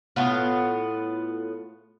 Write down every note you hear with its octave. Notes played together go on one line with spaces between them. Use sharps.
A2 B3 F4